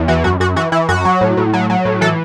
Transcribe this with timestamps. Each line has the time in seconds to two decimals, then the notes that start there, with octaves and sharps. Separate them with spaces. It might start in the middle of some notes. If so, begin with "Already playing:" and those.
Already playing: E2
0.08 E3 F#4
0.24 F#2 F#4
0.40 F#2 F#4
0.56 E3 F#4
0.72 E3 E4
0.89 F#2 F#4
1.05 F#3
1.21 A2
1.37 A2
1.53 F#3
1.70 F#3
1.85 A2
2.01 E3 A4